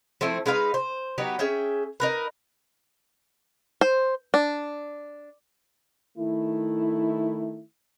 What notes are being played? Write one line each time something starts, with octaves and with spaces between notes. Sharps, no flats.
F3 A3 C4 E4
G#3 D#4 B4 F5
C5
F#3 B3 D#4 G4
C#4 G#4 E5 G5
D#4 A#4 B4
C5
D4
D#3 A3 E4